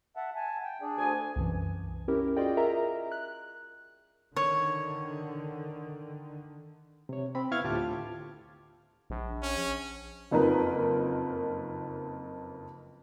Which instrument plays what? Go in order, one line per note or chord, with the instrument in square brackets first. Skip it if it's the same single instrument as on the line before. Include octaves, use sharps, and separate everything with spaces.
[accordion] E5 F#5 A5
G#5 A5
G5
D4 G#4 D5
[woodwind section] D2 G#5
[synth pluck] C2 F#2 E3
C#4 E4 G4 A#4
F4 F#4 G#4 D5 D#5 G5
F4 G#4 A#4 D#5 E5 A#5
F#6
[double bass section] D3 D#3 [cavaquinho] C#5
[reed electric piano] C3 C#5
C4 B5
B3 E4 F5 C#6 F6 G#6
D2 A2 F4 G4 A5 D6
[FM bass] A#1
[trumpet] C#4
[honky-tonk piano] F#1 F2 D#4 A#4 B4